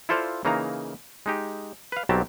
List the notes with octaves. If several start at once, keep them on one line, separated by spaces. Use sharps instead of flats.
E4 F4 A4 C5 D5 F5
C#3 E3 A#3 D#4 F5 A#5
G#3 D#4 G4
B4 F5
B1 F#3 G3 C4 G4 A5